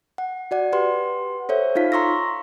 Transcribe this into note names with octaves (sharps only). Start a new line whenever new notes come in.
F#5
F#4 D5 F#5
G4 B4 F#5 C6
A4 C5 C#5 E5
D#4 F4 F5 B6
A#5 C6 C#6 E6 A#6